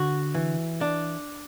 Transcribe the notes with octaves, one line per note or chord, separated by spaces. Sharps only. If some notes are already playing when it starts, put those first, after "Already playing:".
Already playing: D3 F#4
E3
D4